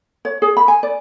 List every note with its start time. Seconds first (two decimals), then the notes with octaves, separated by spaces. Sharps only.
0.25 C#5
0.42 G#4
0.57 B5
0.68 G#5
0.83 D5